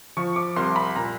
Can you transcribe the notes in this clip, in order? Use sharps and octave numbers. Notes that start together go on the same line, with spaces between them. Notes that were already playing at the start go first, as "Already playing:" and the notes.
F3 C#6
D6
C2 C6
B5
A#2 A#5